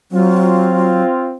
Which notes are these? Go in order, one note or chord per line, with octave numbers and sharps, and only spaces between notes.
F#3 C4 F4